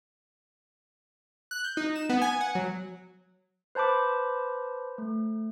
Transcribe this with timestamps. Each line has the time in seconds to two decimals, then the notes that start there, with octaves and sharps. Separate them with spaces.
1.51 F#6
1.64 G6
1.77 D#4
1.95 E7
2.09 B3
2.22 G#5
2.41 F#5
2.55 F#3
3.75 B4 C5 A5 B5 D6
4.98 A3